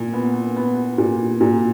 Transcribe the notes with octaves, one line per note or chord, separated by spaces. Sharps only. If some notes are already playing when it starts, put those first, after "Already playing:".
Already playing: A#2
B3
B3
A#2
A#2